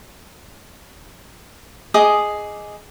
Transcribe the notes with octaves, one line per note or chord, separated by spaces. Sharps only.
G#4 D#5 D6 D#6